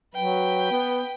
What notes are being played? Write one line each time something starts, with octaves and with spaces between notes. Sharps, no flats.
F#3 B4 G5
B3